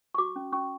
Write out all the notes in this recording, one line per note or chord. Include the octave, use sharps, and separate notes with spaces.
C#6
F#4 D6
C#4
C#4 C#6